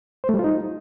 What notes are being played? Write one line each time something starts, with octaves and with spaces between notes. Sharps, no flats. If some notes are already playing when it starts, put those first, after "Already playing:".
C5
A3
G3
F4
D#4